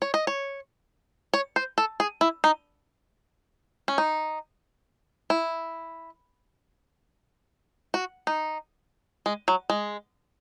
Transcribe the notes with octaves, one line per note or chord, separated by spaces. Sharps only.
C#5
D#5
C#5
C#5
C5
A4
G#4
E4
D#4
C#4
D#4
E4
F#4
D#4
G#3
F#3
G#3